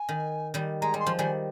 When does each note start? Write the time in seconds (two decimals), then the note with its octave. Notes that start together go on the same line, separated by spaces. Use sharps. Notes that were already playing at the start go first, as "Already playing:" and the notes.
Already playing: G#5
0.09 D#3
0.54 D#3 G3
0.82 G#3 A#5
0.94 G3
1.00 C6
1.06 F3
1.18 D#3 G3 G#5